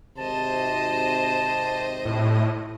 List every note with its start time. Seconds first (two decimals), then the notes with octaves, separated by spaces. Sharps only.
0.18 G#1 C3 C5 D#5 A5
2.05 A2